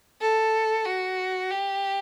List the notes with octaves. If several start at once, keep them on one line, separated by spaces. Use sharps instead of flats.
A4
F#4
G4